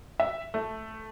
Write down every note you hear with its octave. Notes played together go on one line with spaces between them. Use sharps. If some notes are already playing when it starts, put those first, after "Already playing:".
E5
A3